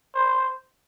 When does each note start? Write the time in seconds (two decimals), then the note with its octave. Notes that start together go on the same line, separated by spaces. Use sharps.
0.15 C5